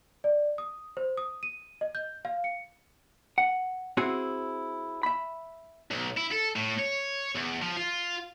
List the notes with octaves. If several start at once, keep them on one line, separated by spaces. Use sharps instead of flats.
D5
D#6
C5
D#6
D#7
D#5
G6
F5
C#7
F#5
C4 E4 F#4 G#4
E5 B5
B1
E4
A4
A2
C#5
E2
F3
F4